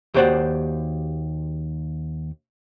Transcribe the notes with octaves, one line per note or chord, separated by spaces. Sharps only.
D#2 F#4 G4 C5 D5 F#5